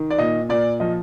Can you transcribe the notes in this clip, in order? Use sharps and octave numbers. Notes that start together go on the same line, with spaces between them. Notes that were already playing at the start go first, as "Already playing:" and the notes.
Already playing: D#3
D5
A#2 D#5
A#2 D5
F3 D#5